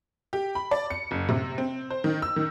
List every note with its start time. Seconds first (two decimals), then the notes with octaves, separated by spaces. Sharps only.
0.33 G4
0.55 B5
0.71 D5
0.90 C#7
1.11 F#1
1.29 C3
1.58 C4
1.90 C5
2.04 D#3
2.22 E6
2.36 D#3